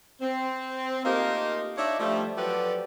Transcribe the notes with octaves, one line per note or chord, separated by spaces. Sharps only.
C4
A3 A#3 D#4 F4 G4 A#4
D4 D#4 C#5 D5 E5
F3 G3 A3
F3 F#3 G4 A4 B4 D5